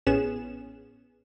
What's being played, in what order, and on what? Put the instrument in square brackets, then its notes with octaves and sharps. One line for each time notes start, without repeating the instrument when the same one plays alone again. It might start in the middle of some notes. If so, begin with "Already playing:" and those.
[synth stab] A1 B3 C#4 G#4 E7